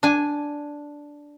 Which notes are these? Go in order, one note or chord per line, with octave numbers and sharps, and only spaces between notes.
D4 G#5